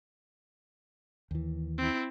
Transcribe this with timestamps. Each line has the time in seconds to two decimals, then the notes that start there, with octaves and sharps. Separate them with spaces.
1.31 D#2 E3
1.78 C4 E4